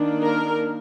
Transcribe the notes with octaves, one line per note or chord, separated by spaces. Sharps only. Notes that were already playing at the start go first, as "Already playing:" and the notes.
Already playing: D#3 A#3 D4
A#4